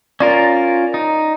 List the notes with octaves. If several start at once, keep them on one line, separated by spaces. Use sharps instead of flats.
C#4 F4 A#4 D5
D#4